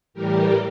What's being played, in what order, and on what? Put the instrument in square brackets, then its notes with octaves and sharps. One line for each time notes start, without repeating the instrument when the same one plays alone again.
[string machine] A2 E3 G3 G4 A#4